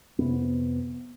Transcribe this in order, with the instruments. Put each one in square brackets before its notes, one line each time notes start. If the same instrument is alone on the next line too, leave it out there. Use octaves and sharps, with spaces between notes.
[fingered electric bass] F2 C3 B3